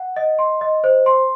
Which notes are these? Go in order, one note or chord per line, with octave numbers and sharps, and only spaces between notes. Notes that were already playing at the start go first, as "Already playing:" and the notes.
Already playing: F#5
D#5
C6
D#5
C5
C6